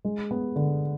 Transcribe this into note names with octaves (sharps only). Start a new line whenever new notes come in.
G#3
B3
D3